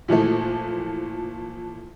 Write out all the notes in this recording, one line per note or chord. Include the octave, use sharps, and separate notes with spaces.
A#2 E3 F3 A3